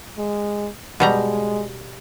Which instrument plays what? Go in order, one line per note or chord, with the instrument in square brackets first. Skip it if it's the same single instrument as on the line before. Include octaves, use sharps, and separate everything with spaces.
[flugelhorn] G#3
[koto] B2 G3 A#5 [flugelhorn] G#3